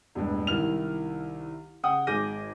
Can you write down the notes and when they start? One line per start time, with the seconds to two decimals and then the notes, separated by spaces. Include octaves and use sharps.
0.15 E1 A1 G2
0.47 C2 D#3 E4 F6 F7
1.83 C#3 F#5 G5 D#6
2.07 G#1 G#4 D6 G6 A#6 D#7